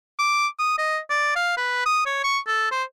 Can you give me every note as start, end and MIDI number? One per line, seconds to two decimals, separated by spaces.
0.19 0.47 86
0.59 0.74 87
0.78 0.98 75
1.10 1.31 74
1.36 1.52 77
1.57 1.83 71
1.86 2.03 87
2.06 2.23 73
2.24 2.39 85
2.47 2.68 69
2.71 2.83 72